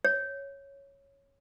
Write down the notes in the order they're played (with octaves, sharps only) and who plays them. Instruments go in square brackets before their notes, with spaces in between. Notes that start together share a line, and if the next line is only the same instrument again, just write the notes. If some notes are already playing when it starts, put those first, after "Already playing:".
[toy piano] C#5